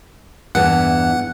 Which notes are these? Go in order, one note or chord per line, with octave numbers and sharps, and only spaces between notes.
E2 G2 E3 F#5